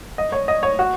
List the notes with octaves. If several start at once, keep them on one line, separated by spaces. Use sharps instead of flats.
D#5
C#5
D#5
C#5
F#4